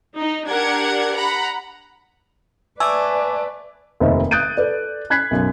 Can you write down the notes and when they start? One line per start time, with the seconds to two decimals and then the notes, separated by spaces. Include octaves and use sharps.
0.18 D#4
0.48 D4 G4 A#4 F#5 G#6
1.15 F#5 A#5 B5
2.80 A3 B4 D5 G#5 D6 E6
4.00 F1 D#2 D#3 C5 D#5 E5
4.31 D#6 F#6 G6 A6 D7 D#7
4.57 A4 B4 D5
5.10 B5 F#6 G#6 B6 C7
5.31 B1 F#2